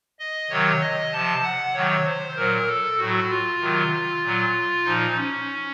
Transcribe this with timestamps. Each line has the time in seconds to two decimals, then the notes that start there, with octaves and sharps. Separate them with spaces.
0.19 D#5
0.50 C3 D#3 F#3 C#5
0.81 D#5
1.12 C3 F3 A5
1.43 F#5
1.74 C3 D#3 F#3 C#5
2.06 C5
2.36 A#2 F#3 A#4
2.67 A4
2.98 A2 F#3 F#4
3.29 F4
3.61 C3 D#3 F#3
4.22 A#2 F#3
4.85 A#2 F3 D#4
5.15 C#4